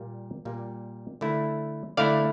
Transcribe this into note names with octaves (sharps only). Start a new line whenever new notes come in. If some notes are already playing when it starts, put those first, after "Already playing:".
Already playing: A#2 G3 A#3
A#2 G3 A#3
D3 A3 E4
D3 A3 E4 D5 F5